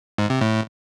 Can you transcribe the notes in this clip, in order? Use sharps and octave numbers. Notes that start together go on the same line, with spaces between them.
G#2
C3
A2